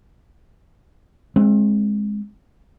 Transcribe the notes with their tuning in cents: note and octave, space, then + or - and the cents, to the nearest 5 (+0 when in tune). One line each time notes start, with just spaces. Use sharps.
G#3 +0 C4 +30